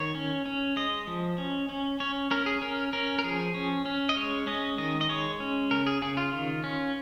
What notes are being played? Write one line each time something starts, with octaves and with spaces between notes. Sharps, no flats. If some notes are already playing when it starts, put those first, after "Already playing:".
Already playing: D#3 C#5
C#4
C#4
G#3 D#5
F3
C#4
C#4
C#4 C#5
C#4 A#4
G#4
C#4 A#4
C#4 A#4
A#4
F3 G#4
C#4
C#4
D#5
G#3 C#5
C#4 D#5
D#3 D#5
D#5
G#3 C#5
C#4
C#3 A#4
G#4
C#3 G#4
F4
D#3
C#4